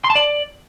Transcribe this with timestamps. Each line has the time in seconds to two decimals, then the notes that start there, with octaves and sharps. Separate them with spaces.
0.04 C6
0.10 A5
0.15 D5